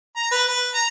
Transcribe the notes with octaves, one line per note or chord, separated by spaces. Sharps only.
A#5
B4
B4
A#5